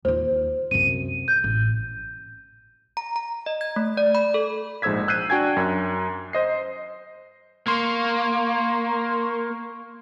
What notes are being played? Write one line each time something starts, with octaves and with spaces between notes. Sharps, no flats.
D#2 F4 C5
C2 F#2 D#7
G6
A1
A#5
A#5
D#5
G#6
A3
D5
B5
A4
A#1 G#2 C5 E6 G#6 B6
E6 F#6 G6 B6 C7 D#7
D4 F#4 G5 G#5 G#6
F#2
C5 D#5 C7
A#3 C6 C#6